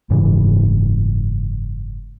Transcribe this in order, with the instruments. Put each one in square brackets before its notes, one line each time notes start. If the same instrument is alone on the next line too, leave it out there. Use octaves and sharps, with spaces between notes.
[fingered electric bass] F#1 G#2 C#3 E3